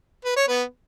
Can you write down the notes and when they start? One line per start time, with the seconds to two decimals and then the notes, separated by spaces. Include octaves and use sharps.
0.25 B4
0.36 C#5
0.48 B3 B4